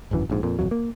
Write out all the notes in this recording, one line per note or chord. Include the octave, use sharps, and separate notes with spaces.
D1 G#1 F#2 E3
A#1 G#2
F2 A#2
D#1 F2 F#3
A#3